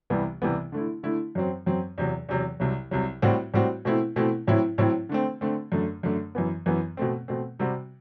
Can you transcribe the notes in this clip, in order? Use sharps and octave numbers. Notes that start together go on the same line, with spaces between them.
C2 C3 E3 G3 B3
C2 C3 E3 G3 B3
D3 A3 E4
D3 A3 E4
F#2 F#3 C4
F#2 F#3 C4
E2 C3 F#3
E2 C3 F#3
C2 C3 F#3
C2 C3 F#3
A2 G3 C4 F#4
A2 G3 C4 F#4
B2 A3 C4 E4
B2 A3 C4 E4
A2 F#3 C4 E4
A2 F#3 C4 E4
D3 A3 C4
D3 A3 C4
F#2 D3 A3
F#2 D3 A3
F#2 E3 B3
F#2 E3 B3
B2 A3 C4
B2 A3 C4
C3 G3 C4 F#4